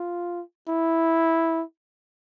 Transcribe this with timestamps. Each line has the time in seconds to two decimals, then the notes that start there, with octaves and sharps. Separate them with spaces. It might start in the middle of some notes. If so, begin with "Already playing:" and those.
Already playing: F4
0.69 E4